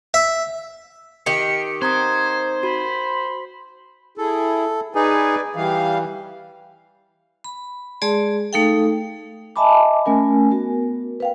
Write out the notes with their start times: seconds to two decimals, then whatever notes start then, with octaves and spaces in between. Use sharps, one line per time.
0.14 E5
1.26 D#3 G4 C#7
1.82 C4 C5 A#5 D#6 G#6
2.63 F#4 B5
4.18 E4 G#4 A4
4.95 D#4 G#4 B4 D5 G#5
5.56 E3 G3 F5
7.44 B5
8.02 G#3 G#4 D5 A5 C6
8.53 A3 D#4 A4 F5 G5
9.56 D#5 E5 G#5 A5 B5 D6
10.06 A3 C#4 A#4 G#5
10.51 B3 F#4 A#4
11.20 B4 F5 G5